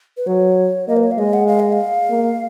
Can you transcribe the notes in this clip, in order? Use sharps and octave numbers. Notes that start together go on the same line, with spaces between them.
B4
F#3 C#5
A#3 D#5
B4
C#5
F5
G#3 D#5
F#5
F5
D#5
F5
A#3